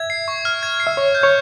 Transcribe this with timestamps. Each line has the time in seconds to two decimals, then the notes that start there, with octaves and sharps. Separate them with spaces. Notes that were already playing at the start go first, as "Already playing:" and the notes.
Already playing: E5 G#6
0.10 C7
0.28 C#6
0.45 F6
0.63 G#6
0.80 C7
0.87 E5
0.97 C#5 C#6
1.15 G6
1.23 C#5